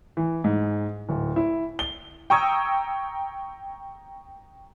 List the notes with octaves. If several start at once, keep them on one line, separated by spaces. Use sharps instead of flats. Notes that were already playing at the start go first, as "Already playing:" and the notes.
E3
G#2
D1
E4
G7
G5 A#5 C#6 D#6 E6 G#6